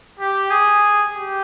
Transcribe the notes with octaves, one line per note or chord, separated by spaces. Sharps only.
G4
G#4
G4